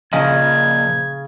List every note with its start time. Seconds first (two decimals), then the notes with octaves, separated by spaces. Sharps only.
0.13 A#2 C#3 F3 D#5 G#6